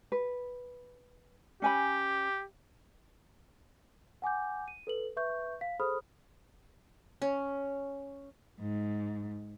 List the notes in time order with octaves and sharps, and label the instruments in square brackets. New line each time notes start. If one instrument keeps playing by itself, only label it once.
[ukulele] B4
[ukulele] C#4 G#5 B5 [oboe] G4
[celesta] F#5 G#5 D6 G6
D#7
A4 B4 F#7
B4 E5 C#6 G6
F5 B6
G#4 A4 C5 B5 D#6 F6
[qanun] C#4
[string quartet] G#2